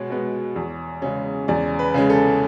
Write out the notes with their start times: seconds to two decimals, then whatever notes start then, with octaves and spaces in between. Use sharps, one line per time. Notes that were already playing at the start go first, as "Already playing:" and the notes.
Already playing: B2 G#3 C#5
0.10 G#3 B3
0.56 E2
1.02 C#3 G#3 C#4
1.48 E2 D5
1.79 B4
1.94 C#3 G#3 C#4
2.10 A4